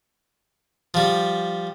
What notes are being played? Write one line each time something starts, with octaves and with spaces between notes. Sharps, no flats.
F3 G3